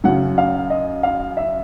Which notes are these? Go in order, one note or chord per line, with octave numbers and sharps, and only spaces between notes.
F#2 C#3 F#3 F#5
F5
D#5
F5
E5